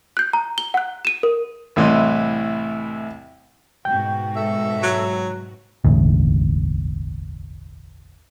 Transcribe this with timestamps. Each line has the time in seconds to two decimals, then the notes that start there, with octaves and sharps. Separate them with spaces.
0.17 F#6 G6
0.33 A#5
0.58 G7
0.74 F#5 F#6
1.05 D#7 E7
1.23 A#4
1.76 C2 A2 E3 D#5 C6
3.85 G#2 B2 F#4 G5 G6
4.36 A4 E5
4.83 F#3
5.85 E1 A1 D2